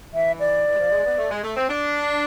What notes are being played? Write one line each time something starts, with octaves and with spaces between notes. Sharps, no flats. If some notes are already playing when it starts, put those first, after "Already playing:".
E3 E5
D5
E3
G#3
F3
G#3
B3
A3
G#3
A3
C4
D4